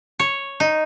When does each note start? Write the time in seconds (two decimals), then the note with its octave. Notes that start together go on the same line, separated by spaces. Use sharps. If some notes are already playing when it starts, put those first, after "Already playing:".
0.19 C#5
0.60 D#4